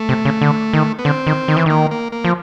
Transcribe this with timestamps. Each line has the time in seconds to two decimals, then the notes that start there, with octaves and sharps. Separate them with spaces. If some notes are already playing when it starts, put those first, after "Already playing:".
Already playing: A3
0.09 C3
0.25 C#3
0.41 D3
0.73 D#3
0.99 B3
1.05 D3 C4
1.27 D#3
1.48 D#3
1.57 E3
1.66 D#3 A#3
1.91 A#3
2.12 A#3
2.25 F3